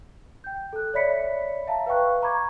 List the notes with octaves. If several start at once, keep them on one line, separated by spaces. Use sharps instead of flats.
G5 G6
A4 F#6
C#5 D5 E5 B5 B6 C#7
E5 F5 A5 A#5
B4 F5 G5 C#6 F#6
A#5 B5 C#6 D6 G#6